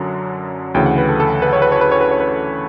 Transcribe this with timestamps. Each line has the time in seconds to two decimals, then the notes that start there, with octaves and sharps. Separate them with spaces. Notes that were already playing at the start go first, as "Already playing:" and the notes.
Already playing: F#2 D3 F#3 F#5
0.74 D2 C#3 E3 G5
0.86 F#5
0.98 B4
1.09 A4
1.20 A4
1.42 B4
1.53 C#5
1.62 B4
1.72 C#5
1.81 B4
1.92 C#5
2.01 B4
2.11 C#5
2.20 B4